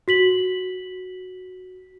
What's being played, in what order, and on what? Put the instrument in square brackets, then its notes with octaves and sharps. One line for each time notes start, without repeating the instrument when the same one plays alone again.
[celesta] F#4 B6 F#7